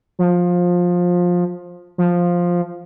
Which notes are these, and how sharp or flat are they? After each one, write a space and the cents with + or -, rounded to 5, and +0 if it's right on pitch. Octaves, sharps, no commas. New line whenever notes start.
F3 +20
F3 +5